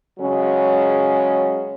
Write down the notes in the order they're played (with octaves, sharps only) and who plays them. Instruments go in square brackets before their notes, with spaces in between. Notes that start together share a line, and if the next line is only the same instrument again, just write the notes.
[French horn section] C#3 F#3 G#3 C#4